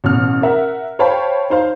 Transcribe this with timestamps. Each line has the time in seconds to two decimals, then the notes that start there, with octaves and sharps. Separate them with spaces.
0.04 A1 B2 F6
0.42 A#4 E5 F#5
0.99 C5 C#5 F5 G5 A5 B5
1.50 D#4 C5 F5